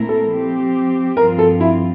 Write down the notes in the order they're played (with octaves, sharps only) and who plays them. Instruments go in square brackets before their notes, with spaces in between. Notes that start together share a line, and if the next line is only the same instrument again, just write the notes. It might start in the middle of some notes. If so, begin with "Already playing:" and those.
Already playing: [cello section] A#2 A3 C4 E4 A#4
[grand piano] A4
[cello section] F3 C4 G4
[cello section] G2 F3 C4 F4 [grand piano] A#4
[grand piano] A4
E4